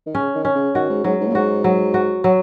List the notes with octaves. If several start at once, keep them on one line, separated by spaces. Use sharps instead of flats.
D#3
C#3 C#4
D#3
C#4
C#3
D#3 F#4
G#2
G#2 F#3
G#2
A#2
G#2 F#4
F#3
F#4
F#3